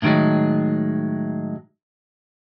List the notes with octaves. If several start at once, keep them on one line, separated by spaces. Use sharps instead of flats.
A2 D3 D#3 F#3 G#3